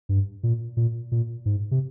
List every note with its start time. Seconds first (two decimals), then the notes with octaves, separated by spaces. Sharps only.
0.09 G2
0.43 A#2
0.77 A#2
1.12 A#2
1.46 G#2
1.71 C3